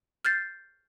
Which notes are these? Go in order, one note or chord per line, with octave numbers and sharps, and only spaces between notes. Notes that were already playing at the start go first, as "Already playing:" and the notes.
F6 G6 A6 C7